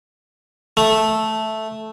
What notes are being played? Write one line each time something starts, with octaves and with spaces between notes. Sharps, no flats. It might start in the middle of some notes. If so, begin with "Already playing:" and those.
A3